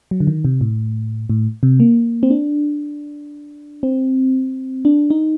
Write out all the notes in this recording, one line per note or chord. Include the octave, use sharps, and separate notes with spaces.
F#3
D3
D#3
C3
A2
A2
C3
A#3
C4
D4
C4
D4
D#4